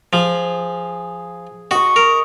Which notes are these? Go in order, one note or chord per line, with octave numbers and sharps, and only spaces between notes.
F3 G#4
F#4 D#5 C#6
A#4